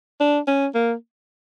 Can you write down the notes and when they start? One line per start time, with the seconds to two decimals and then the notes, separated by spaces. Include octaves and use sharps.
0.20 D4
0.48 C#4
0.74 A#3